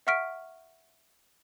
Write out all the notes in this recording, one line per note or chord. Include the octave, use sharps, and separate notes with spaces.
E5 F#5 C#6 F6 B6 D7